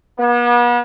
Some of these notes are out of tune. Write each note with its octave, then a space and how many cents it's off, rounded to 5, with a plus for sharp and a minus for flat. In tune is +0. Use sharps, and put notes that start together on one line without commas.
B3 -40